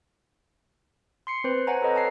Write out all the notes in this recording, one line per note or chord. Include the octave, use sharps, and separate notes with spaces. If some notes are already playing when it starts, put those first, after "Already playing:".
C6 C7 C#7
C4 B4 C5
C5 C#5 F#5 G#5 A#5
A4 B4 C#5 D#5 A#5
A5 C7